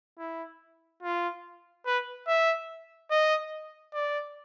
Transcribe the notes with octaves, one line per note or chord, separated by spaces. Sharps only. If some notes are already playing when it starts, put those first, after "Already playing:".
E4
F4
B4
E5
D#5
D5